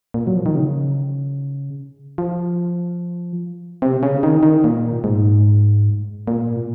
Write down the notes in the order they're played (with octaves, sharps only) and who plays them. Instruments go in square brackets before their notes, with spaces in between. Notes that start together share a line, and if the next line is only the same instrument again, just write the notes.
[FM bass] A#2
F#3
F3
D#3
C#3
F3
C3
C#3
D#3
D#3
A#2
G#2
A#2